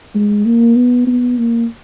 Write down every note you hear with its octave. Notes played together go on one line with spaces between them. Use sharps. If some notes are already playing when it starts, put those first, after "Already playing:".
G#3
A#3
B3
B3
A#3